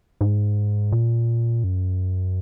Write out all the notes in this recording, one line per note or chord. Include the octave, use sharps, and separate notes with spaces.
G#2
A#2
F#2